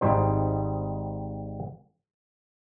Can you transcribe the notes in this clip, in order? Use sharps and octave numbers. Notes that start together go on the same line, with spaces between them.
G#1 G#2 G3 D#4 C5